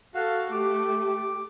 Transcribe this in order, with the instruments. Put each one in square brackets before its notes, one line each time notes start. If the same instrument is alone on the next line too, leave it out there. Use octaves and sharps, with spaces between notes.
[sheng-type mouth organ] F#4 F5 [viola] A4
[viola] A3 [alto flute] G4 [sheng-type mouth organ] D6